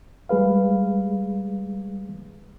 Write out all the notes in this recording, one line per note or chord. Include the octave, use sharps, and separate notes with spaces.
G3 G#3 G#4 B4 F5